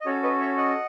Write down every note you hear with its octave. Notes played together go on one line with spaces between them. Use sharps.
D#5
C#4 F#4 A4 C#5
B4 D#5
C#5 E5
D#5 F#5